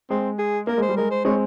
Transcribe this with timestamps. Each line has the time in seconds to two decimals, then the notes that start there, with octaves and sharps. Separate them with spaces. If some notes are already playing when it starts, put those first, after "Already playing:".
0.10 G#3 C4
0.39 G#4
0.67 A#3 A#4
0.78 G#3 C5
0.89 G3
0.97 G#3 A#4
1.11 C5
1.25 G#3 C4 C#5